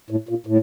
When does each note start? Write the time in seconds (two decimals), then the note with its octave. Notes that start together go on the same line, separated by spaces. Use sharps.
0.10 A2
0.29 A#2
0.47 A2